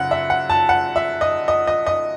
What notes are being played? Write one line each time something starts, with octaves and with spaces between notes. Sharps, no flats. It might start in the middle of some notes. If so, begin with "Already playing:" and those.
Already playing: F#2 C#3 F#5
E5
F#5
A5
F#5
E5
D#5
D#5
D#5
D#5